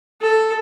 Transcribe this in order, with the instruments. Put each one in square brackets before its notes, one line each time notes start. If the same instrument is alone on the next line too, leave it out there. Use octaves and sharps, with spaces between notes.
[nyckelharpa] A4